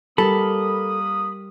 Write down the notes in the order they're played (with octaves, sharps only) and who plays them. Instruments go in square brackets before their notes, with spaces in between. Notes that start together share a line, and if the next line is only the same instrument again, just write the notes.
[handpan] G3 G4 A#4 [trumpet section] A#3 D#6 [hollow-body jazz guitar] A4 [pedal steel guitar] B5